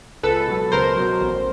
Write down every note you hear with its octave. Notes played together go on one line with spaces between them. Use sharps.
C#2 A4 B4
B2 F#3
C#2 A#4 C5
B2 F#3
A1